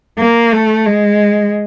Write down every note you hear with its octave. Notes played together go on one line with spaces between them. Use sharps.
A#3
A3
G#3